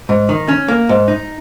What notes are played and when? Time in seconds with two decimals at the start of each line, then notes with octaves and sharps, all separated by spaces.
0.09 G#2
0.29 D#3
0.48 C#4
0.68 A#3
0.89 G#2
1.08 D#4